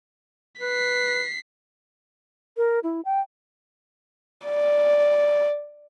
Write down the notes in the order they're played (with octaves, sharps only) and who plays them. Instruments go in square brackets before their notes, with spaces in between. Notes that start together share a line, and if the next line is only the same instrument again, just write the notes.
[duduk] B4 [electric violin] B6 C7
[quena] A#4
E4
G5
[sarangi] D5